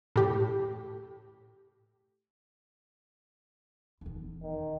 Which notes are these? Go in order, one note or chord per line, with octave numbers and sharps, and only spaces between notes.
A2 G4
D#1 E2
D#3